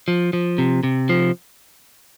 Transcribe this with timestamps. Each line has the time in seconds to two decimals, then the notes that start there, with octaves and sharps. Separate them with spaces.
0.08 F3
0.33 F3
0.58 C3
0.83 C3
1.09 F3